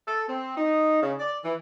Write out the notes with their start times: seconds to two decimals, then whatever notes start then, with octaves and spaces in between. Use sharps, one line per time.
0.07 A4
0.28 C4
0.56 D#4
1.01 C#3
1.18 D5
1.44 E3